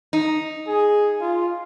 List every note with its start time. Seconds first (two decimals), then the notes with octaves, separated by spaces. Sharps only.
0.13 D#4
0.68 G#4
1.21 F4